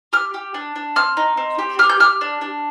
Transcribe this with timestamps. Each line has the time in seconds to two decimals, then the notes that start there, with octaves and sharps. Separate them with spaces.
0.13 G4 F6
0.34 G4
0.54 D4
0.76 D4
0.96 C4 F6
1.17 D#4
1.37 C4
1.59 G4
1.79 G4 F6
1.90 G6
2.00 G4 F6
2.21 D4
2.41 D4